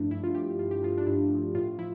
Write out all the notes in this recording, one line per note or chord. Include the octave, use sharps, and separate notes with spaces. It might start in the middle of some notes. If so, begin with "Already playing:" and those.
Already playing: G2 F3 A3 D4 E4
G2 E4
F4
F3 A3 G4
G2 F4
G4
F3 A3 F4
D4
G2 E4
F3 A3
A2 F4
F3 E4